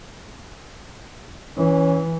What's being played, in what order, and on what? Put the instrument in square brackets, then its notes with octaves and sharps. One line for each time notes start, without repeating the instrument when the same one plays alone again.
[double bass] E3 [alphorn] C#4